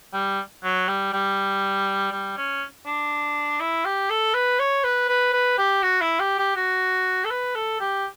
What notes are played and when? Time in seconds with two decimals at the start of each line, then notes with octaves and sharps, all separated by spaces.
0.14 G3
0.64 F#3
0.88 G3
1.13 G3
2.12 G3
2.37 C#4
2.86 D4
3.60 E4
3.85 G4
4.10 A4
4.34 B4
4.59 C#5
4.84 B4
5.09 B4
5.33 B4
5.58 G4
5.83 F#4
6.02 E4
6.20 G4
6.39 G4
6.56 F#4
7.25 A4
7.31 B4
7.56 A4
7.80 G4